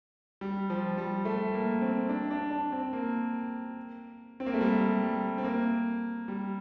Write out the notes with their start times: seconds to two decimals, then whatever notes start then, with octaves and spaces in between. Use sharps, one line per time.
0.41 G3
0.70 F3
0.98 G3
1.25 A3
1.54 A#3
1.81 C4
2.09 D4
2.31 D4
2.51 D4
2.72 C4
2.93 A#3
4.40 C4
4.46 A#3
4.54 A3
4.61 G3
5.03 G3
5.38 C4
5.44 A#3
6.28 G3